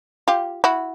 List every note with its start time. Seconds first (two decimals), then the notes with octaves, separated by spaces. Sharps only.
0.28 F4 G4
0.64 E4 F#4